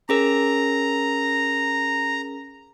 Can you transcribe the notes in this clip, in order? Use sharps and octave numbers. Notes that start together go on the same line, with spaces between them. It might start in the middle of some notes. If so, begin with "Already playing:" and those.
C#4 G#4 A#4 A#5